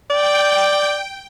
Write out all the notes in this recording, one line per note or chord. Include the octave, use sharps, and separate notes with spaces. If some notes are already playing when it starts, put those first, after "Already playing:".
D5 G5